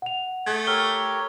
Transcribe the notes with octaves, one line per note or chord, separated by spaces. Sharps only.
F#5 F7
A3 G#4 G#6
G4 A#4 C#5 E6 F6 G7